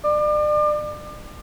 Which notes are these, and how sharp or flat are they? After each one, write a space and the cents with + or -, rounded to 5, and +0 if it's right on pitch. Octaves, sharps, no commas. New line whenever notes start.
D5 +35